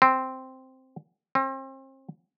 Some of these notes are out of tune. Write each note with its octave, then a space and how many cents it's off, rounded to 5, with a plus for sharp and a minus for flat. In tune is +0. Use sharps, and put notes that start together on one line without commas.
C4 -5
C4 +35